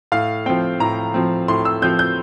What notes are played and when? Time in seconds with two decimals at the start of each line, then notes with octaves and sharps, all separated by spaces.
0.12 A2 F5
0.46 F3 C4 G5
0.80 A2 A#5
1.14 F3 C4
1.48 A2 C6
1.65 E6
1.82 F3 C4 G6
1.99 G6